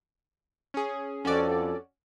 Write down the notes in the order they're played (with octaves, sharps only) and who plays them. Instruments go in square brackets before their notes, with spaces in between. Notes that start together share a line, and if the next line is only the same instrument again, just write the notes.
[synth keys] C#4 G#4
[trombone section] F2 [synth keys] C#4 F#4 D5 [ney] A4